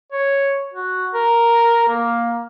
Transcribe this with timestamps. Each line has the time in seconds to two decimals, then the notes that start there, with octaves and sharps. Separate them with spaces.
0.12 C#5
0.74 F#4
1.14 A#4
1.89 A#3